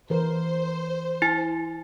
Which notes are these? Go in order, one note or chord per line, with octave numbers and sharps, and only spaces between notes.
E3 A#4 C5
E4 G#5